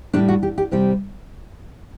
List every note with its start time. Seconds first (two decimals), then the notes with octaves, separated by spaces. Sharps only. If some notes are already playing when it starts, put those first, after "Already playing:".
0.13 A2 G3 D4
0.28 F#4
0.43 G4
0.58 G4
0.71 C3 G3 G4